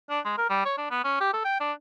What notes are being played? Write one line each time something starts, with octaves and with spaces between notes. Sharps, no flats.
D4
G#3
A#4
G3
C#5
D4
B3
C#4
G4
A4
G5
D4